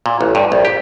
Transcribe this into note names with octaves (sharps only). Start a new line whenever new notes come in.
A#2
A1
G2
A#1
G4